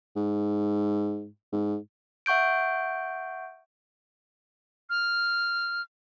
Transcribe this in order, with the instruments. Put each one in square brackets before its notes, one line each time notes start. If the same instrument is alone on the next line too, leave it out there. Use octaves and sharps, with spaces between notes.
[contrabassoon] G#2
G#2
[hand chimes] E5 F#5 C#6 G6 D7
[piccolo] F6